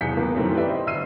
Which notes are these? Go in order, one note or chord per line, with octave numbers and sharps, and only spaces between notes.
E1 C2 G#4 G6 B6 C#7
C#2 A#3 B3
F#2 D#3 E3 A3 C4
G4 B4 D5 E5
C5 D#5
G1 E5 E6 C7 D#7